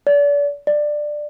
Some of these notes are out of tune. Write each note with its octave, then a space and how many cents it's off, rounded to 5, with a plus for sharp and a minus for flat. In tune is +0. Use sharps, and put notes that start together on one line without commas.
D5 -35
D5 +15